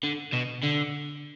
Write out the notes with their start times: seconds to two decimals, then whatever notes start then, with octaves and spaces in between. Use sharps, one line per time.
0.04 D3
0.33 B2
0.64 D3